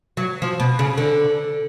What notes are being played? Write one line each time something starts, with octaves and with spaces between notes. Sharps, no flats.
F#3
F3
B2
C#3
D3